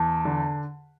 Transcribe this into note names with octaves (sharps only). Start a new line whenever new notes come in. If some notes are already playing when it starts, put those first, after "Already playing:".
Already playing: E2 A5
D3